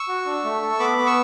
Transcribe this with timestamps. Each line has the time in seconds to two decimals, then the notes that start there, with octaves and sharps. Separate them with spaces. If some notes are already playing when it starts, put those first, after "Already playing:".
Already playing: C#6 E6
0.08 F#4
0.26 D4
0.45 A3
0.62 A4
0.79 B3 B5 D6
0.98 B3
1.06 C#6 E6